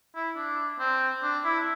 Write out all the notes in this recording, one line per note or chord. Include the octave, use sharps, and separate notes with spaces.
E4
D4
C4
D4
E4